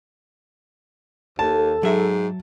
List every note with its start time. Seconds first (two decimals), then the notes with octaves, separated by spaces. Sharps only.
1.39 D#2 A4 A5
1.83 G#2 F#3 E5